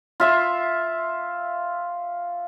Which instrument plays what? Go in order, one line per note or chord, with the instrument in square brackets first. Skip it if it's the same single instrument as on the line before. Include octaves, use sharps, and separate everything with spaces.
[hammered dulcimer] F4 E5 C6